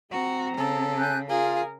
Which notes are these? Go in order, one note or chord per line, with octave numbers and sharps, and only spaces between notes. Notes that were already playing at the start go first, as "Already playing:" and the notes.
C4 F#4 A#5
C#3 A4
G#5 F#6 G6
F4 G#4 A#4 F5